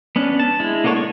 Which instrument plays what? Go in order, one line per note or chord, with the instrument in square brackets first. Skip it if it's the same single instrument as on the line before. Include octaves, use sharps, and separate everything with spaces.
[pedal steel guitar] B3 C#4 D4
A5
G#3 E4
A#3 B3 D4 A4 C#5
C#6